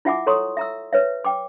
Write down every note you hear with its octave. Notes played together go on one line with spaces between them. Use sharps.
E4 F4 E5 F#5 G#5 D6
A4 C#5 A#5 C6 C#6 D#6
E5 A#5 E6
B4 C#5 E5
G5 D6